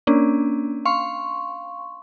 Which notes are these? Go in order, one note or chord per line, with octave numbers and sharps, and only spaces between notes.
A#3 C#4 D4
F5 C6 C#6